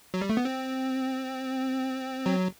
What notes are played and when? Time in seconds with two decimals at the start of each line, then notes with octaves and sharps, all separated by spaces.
0.14 F#3
0.21 G3
0.30 A3
0.37 B3
0.45 C4
2.26 F#3